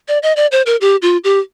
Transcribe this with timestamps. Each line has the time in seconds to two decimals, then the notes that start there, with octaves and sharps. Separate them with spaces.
0.08 D5
0.23 D#5
0.36 D5
0.52 C5
0.66 A#4
0.81 G4
1.02 F4
1.24 G4